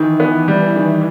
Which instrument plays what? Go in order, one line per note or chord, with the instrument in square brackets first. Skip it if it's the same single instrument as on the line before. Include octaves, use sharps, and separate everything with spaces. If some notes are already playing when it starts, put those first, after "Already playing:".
Already playing: [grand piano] D#3 [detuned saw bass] E3
[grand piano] B3
G3
D#3